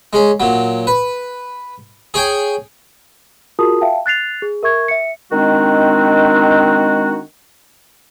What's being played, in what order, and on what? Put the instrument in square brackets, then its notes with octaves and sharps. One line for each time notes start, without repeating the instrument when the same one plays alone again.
[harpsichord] G#3 C#4
A#2 F#3
B4
G#4 C#5 G5 G#5
[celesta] F4 F#4 G#4 A#4 A5 D#6
E5 F5 G5 A5
F#6 A6 C7 F7
G#4
A#4 E5 C#6 G#6
E5 C#7
[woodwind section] D#3 G#3 C4 D4 F#4